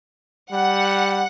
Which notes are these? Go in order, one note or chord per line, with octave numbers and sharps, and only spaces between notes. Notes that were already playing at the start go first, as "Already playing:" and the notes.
G3 F#5